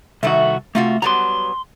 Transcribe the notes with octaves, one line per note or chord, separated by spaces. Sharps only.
C2 D#3 A3 F#4 E5
C3 A3 F4 F#4
F#3 G3 B3 A#5 C6